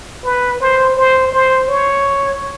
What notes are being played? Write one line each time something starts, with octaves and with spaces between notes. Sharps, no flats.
B4
C5
C5
C5
C#5